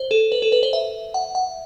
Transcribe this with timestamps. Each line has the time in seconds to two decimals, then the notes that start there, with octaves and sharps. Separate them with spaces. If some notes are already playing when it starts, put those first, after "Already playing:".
Already playing: C5
0.11 A4
0.32 B4
0.42 A4
0.52 B4
0.63 C5
0.73 E5
1.14 F#5
1.35 F#5